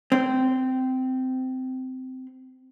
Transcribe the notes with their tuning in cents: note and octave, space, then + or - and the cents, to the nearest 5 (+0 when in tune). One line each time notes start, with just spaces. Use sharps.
C4 -15